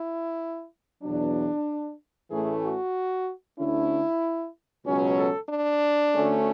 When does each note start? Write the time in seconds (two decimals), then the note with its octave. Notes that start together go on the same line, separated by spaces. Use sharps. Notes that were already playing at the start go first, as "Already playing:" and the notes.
Already playing: E4
1.03 E2 B2 F#3 D4
2.30 A2 E3 A3 C#4 G#4
2.63 F#4
3.58 D2 D3 A3 C#4 E4
4.86 C#2 B2 F#3 C#4
5.18 A4
5.50 D4
6.14 D2 D3 A3 C#4